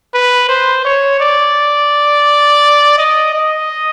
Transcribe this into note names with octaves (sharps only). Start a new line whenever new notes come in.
B4
C5
C#5
D5
D#5
D#5